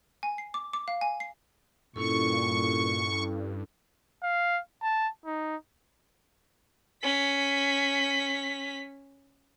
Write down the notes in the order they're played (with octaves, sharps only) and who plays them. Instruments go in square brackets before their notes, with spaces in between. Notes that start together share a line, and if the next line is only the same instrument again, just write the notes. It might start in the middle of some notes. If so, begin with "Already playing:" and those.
[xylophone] G#5
C7
D6
D6
F5
G#5
C7
[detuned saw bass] G2 [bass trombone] A#2 [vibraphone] C#4 E4 A4 [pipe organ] C#6
[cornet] F5
A5
D#4
[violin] C#4 B6